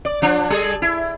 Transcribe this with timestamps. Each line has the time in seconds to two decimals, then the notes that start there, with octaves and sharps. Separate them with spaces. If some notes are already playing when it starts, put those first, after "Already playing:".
0.05 D5
0.22 F3 D4
0.50 G3 G#4 A4
0.82 E4